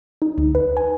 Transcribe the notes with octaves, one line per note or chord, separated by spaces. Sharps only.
D#4
D2
B4
G#5